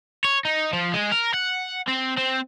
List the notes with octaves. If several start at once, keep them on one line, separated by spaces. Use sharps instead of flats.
C#5
D#4
F3
G#3
A#4
F#5
C4
C4